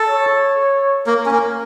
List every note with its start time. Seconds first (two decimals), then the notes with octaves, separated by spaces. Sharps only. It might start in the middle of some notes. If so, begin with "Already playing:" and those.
Already playing: A4
0.09 C#5
1.06 A#3 A#4
1.26 C#4
1.31 A#3